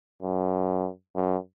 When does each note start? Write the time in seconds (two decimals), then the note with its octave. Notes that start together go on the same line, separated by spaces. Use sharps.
0.22 F#2
1.15 F#2